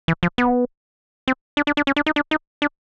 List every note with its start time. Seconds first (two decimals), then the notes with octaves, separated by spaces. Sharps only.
0.08 E3
0.23 F3
0.38 B3
1.28 C4
1.57 D4
1.67 D4
1.77 D4
1.87 C#4
1.96 D4
2.06 D#4
2.16 D4
2.31 D#4
2.62 D4